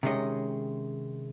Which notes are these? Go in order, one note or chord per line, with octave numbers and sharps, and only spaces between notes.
C3 D#3 G#3 C#4 D#5